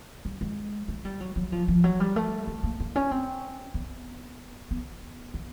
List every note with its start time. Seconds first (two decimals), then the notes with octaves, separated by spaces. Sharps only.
0.25 G3
0.41 G#3
0.88 A3
1.05 G3
1.21 F#3
1.36 F#3
1.52 F3
1.68 F3
1.84 F#3
2.00 G3
2.16 A3
2.47 A3
2.64 A#3
2.80 A#3
2.96 C#4
3.11 C4
3.74 B3
4.71 B3
5.34 B3